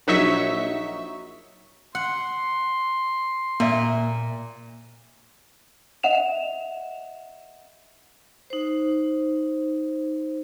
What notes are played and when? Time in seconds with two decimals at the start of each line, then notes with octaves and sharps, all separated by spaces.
0.07 A#1 F#3 D#4 E5 C#6 B6
1.95 F#5 C6
3.60 A#2 A#3 E5
6.03 D#5 E5 F#5 E7 F7
8.50 D#4 C5